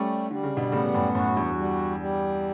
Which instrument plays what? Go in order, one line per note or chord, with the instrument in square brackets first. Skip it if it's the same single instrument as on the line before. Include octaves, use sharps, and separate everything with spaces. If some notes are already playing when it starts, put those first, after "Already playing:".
Already playing: [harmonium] G3 [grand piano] A3 C#4
[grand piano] D3 [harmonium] G3
[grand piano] C#3
B2 D3
[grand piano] A2 C#3 [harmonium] B3
[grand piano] F#2 A2
[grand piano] F#2 A2 [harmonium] F#4
[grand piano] E2 G2
[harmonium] G3
G3